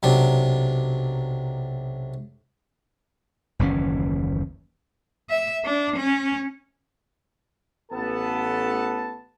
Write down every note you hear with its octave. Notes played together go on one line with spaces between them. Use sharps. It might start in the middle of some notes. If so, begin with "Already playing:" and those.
B1 C3 F#3 D4
F#1 D#2 E3 C#4
E5
D4
C#4
A1 B3 A4 A5